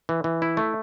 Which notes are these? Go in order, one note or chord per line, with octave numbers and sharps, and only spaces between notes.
E3
E3
E4
A3